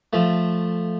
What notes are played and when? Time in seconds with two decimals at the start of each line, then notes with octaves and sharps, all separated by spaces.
0.13 F3 A3